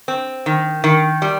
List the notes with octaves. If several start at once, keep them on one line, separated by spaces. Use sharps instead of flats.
C4
D#3
D#3
G3